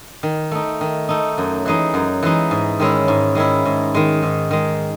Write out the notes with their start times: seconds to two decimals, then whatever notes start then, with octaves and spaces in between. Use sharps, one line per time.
0.23 D#3
0.51 A3 D#4
0.81 D#3
1.09 A3 D#4
1.38 F#2
1.65 E3 G#3 D#4
1.94 F#2
2.23 E3 G#3 D#4
2.51 G#2
2.80 D#3 G#3 C#4 E4
3.08 G#2
3.35 D#3 G#3 C#4 E4
3.65 G#2
3.95 D#3 G#3
4.23 G#2
4.51 D#3 G#3